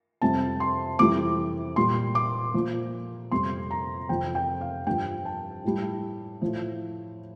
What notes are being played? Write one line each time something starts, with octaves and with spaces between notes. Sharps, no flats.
F2 C3 G3 A5
C6
F2 C3 E3 G3 D6
A#2 G3 C6
D6
A#2 F3
F2 C3 G3 C6
A#5
F2 C3 F3 G5
G5
F5
G2 F3 G5
A5
A2 G3
A2 F3